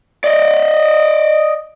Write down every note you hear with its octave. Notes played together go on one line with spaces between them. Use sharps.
D5 D#5